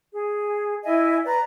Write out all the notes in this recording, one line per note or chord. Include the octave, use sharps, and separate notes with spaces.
G#4
E4 D#5 E5 G#5
B4 D5 A#5